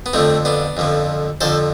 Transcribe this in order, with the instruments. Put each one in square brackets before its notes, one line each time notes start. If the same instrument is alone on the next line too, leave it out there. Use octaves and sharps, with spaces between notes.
[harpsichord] B3
F2 D3 F3 A3 C4
B3 D4
F2 D3 F3
F2 D3 F3 A4 C5